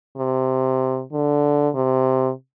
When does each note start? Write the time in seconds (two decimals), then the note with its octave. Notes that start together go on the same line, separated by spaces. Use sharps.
0.17 C3
1.12 D3
1.75 C3